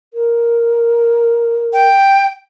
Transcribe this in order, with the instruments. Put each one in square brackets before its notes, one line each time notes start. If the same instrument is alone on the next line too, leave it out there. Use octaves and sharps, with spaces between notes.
[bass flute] A#4
[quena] G5